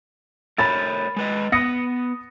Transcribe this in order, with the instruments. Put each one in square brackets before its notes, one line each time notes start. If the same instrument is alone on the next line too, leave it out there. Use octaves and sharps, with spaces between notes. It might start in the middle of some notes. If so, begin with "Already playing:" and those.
[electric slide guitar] A3 A#4 C#5 [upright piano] B5 A6
[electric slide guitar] G#3 B4 D#5
[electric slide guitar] B3 B4 [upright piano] D#6 A#6 C#7